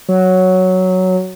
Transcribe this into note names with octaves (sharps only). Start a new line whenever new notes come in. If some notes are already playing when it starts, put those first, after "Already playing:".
F#3